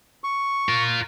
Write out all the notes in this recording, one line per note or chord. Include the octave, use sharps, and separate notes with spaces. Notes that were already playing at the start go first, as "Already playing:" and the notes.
C#6
F4 A#4